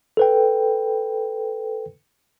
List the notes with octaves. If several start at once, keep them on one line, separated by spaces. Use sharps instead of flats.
A4 B4 G5